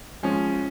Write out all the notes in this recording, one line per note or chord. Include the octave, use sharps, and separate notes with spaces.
F3 G#3 C#4